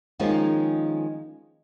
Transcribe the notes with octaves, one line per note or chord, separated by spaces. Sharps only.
D#3 F3 G#3 A#3 C#4 F4